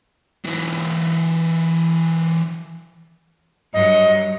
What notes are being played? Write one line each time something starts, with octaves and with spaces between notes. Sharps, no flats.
E3 F#3
G2 F#3 D#5